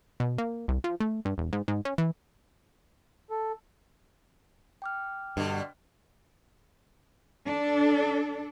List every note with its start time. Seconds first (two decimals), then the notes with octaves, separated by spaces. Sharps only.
0.20 B2
0.38 A#3
0.68 C2
0.84 F3
1.00 A3
1.25 G2
1.38 E1
1.53 G#2
1.68 G#2
1.85 C#4
1.98 E3
3.30 A4
4.82 G5 D6 F6
5.37 G2 B2 D3
7.46 D4 A4